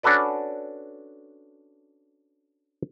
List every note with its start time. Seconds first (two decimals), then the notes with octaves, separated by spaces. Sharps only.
0.03 C#4 D4 F#4 A4 B4 D5